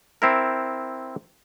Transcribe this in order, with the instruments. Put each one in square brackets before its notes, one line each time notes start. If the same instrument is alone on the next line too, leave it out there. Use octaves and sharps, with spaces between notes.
[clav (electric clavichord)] C4 E4 A#4